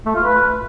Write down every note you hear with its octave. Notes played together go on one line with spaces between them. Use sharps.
A3
F4
B4